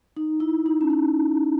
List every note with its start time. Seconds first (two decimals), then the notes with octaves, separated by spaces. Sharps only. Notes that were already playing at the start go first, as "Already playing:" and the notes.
0.17 D#4
0.40 E4
0.66 D#4
0.81 C#4
0.90 D#4